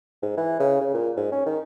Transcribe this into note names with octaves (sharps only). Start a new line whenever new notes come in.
G#2
E3
C#3
C#3
A#2
G#2
C#4
D#3